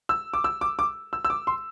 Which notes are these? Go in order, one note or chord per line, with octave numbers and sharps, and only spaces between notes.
E6
D6
E6
D6
D6
E6
E6
D6
C6